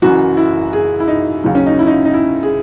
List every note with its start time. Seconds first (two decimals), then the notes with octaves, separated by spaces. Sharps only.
0.02 F#1 F#2 E3 F#4
0.37 E4
0.73 G#4
1.00 E4
1.08 D#4
1.44 D#2 C#3 F#3
1.55 C#4
1.66 D#4
1.79 E4
1.87 D#4
2.05 D#4
2.14 E4
2.43 G#4